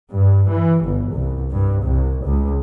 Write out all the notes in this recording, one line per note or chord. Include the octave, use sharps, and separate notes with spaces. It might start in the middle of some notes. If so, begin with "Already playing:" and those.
G2
E3
G1
C2
G2
C2
C#2